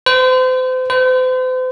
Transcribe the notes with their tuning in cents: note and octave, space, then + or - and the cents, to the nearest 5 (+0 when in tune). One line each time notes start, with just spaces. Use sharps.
C5 -35
C5 -40